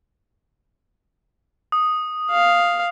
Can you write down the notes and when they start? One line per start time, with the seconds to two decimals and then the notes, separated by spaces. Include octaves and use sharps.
1.72 D#6
2.30 F5